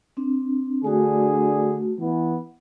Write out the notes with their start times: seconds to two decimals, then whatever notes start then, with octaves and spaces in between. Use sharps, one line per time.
0.17 C4 D4
0.84 D3 A3 D4 F#4 G#4
1.99 E3 B3